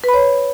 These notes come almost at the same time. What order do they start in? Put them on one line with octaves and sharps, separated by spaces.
B4 B5 C#5